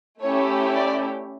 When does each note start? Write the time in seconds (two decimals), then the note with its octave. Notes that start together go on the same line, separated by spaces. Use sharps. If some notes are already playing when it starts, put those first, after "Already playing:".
0.22 A3 C#4 E4 G4 C#5
0.74 D5